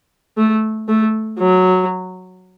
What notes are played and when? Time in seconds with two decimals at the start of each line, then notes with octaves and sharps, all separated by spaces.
0.37 A3
0.88 A3
1.39 F#3